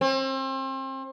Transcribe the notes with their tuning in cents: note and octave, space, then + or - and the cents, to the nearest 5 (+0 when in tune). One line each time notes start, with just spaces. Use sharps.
C4 +35